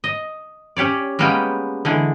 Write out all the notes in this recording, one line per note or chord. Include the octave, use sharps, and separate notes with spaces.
D#5
C#4 G4 C#5 D5
G3 G#3 A#3 B3 C#4 G5
D3 E3 G#3